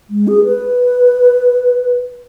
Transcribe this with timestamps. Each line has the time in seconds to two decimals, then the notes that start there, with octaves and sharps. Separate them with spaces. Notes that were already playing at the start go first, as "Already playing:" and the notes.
0.10 G#3
0.27 G#4
0.45 B4